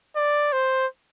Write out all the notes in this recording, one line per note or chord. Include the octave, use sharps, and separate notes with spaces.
D5
C5